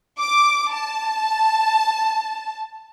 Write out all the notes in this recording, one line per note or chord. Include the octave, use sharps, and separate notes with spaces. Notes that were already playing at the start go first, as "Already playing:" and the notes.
D6
A5